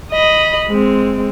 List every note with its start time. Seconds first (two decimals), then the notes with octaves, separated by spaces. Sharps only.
0.12 D#5 B5
0.69 G#3 C4